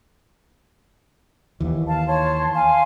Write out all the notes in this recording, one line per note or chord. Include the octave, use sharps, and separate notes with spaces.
D#2 E3
F5 A5
C#5 A5 C6
F5 G#5 C6